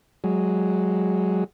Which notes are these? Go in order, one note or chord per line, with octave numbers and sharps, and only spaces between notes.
F#3 G#3